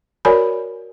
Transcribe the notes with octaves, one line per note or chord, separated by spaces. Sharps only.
F#4 A#4 C#5 D5 G#5 B5